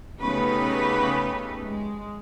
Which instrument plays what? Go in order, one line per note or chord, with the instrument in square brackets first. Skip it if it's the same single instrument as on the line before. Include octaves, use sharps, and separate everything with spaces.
[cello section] C#3 A3 B3 D#4 G4 B4
G#3